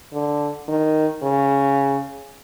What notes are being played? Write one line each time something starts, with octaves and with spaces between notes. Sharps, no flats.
D3
D#3
C#3